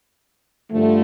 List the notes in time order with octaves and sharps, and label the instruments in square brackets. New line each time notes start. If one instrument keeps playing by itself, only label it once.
[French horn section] G2 D3 F3 A3